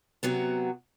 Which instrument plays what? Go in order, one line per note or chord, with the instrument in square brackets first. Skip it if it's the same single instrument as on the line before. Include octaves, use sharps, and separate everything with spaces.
[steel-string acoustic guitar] C3 F#3 B3